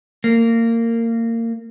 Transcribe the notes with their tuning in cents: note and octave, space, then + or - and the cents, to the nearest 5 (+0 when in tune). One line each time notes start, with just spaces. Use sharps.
A#3 -25